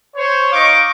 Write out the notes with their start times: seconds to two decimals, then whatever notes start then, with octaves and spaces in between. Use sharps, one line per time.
0.16 C5 C#5
0.52 D#4 D#5 F5 C#6 D6